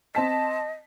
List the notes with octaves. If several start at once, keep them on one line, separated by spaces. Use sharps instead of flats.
C4 D#5 A5 B6